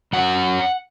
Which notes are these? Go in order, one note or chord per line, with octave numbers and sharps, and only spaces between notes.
F#2 F#3 C#4 F#5